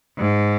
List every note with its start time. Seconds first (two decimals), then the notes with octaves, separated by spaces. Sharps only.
0.18 G#2